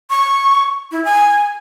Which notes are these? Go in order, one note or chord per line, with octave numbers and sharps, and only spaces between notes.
C#6
E4
G#5